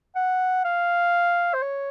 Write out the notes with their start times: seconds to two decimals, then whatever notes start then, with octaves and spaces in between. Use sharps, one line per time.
0.16 F#5
0.65 F5
1.54 C5
1.63 C#5